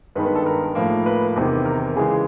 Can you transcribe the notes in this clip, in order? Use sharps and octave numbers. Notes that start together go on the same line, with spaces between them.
G2 D#3 G#3 B3 B4
B4
A4
A#4
A2 F3 A#3
B4
E2 C3 D#3
A#4
C#3 E3 G#3 G#4